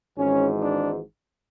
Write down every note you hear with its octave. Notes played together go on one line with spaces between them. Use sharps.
G#1 G#2 E3 G#3 C#4
D4